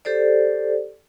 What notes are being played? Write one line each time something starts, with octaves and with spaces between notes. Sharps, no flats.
G4 A4 C5 D5